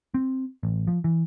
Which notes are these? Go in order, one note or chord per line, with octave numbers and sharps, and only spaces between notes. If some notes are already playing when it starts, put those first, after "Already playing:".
C4
A1
F3
E3